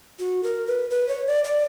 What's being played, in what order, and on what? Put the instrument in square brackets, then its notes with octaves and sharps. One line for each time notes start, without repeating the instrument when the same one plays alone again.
[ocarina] F#4
A#4
B4
B4
C#5
D5
D5